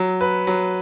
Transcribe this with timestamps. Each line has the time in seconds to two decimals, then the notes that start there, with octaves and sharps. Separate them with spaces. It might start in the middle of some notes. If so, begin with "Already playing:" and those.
Already playing: F#3
0.21 B4
0.47 F#3